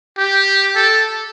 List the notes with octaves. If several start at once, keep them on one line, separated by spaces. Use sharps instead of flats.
G4
A4